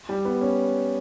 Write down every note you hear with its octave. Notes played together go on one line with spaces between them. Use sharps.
G3
B3
C#4